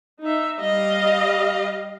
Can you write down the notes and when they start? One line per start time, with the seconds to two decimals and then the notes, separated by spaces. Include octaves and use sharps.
0.22 D#4 E5
0.59 G3 D#5 F5